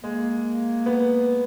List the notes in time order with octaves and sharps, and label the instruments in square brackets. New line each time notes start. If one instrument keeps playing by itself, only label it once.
[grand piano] G#3 [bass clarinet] A#3
[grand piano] B3